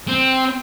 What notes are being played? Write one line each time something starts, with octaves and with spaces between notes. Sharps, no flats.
C4